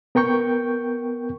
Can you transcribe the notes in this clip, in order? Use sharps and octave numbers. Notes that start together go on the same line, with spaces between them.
B3 A#4 G5 C#6 G6